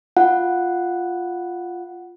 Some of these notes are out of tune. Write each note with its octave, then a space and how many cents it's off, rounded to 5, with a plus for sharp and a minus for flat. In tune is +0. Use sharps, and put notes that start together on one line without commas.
F4 +0 F#5 +0